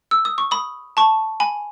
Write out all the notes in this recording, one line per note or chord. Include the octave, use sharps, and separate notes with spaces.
E6
D#6
C#6
B5 D#6
A5 C#6
G#5 B5